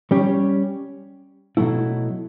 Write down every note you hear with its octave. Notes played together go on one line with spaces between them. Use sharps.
G3 C#4 G4 C#5
B2 F#3 A3 E4